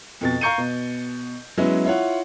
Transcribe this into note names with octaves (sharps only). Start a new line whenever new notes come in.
F2 B2 A6
F5 A#5 C#6 G6 C#7 D#7
B2
F#3 G#3 B3 C#4 E4
E4 F4 C#5 F#5